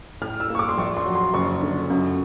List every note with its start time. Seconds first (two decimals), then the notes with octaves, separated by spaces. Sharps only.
0.21 A2 F6
0.40 E6
0.50 A#3 C#6
0.59 D6
0.69 C6
0.78 A#1 C#6
0.97 C6
1.06 F#3
1.15 C6
1.34 F#1 C#6
1.62 D3
1.90 F#2